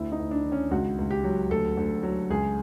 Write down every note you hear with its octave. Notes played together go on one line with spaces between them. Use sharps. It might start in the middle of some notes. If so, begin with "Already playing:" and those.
Already playing: D2 E4
D#4
D2
D4
D#3
C#4
C#2 F#4
C#2
G4
F#3
D2 A4
D2
F#3
C#2 G#4